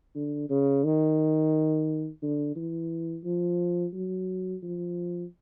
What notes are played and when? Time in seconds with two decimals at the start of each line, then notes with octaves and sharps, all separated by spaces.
0.15 D3
0.50 C#3
0.84 D#3
2.22 D3
2.56 E3
3.24 F3
3.94 F#3
4.63 F3